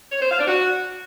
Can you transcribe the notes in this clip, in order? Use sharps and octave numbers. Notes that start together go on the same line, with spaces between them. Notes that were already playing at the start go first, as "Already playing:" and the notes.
C#5
C5
F5
D4
F#4